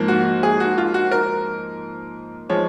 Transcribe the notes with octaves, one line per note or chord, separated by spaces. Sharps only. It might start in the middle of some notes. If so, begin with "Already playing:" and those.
Already playing: G#2 F3 A#3
F#4
G#4
F#4
F4
F#4
A#4
F3 G#3 C#5